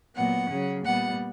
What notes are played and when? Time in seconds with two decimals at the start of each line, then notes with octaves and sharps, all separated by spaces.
0.15 A#2 F#3 B3 F#5
0.49 C#3 F#3 C#4
0.84 A#2 G3 B3 F#5